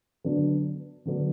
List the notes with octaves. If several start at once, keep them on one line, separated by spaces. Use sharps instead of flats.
D3 F#3 B3 D4
D3 F#3 B3 D4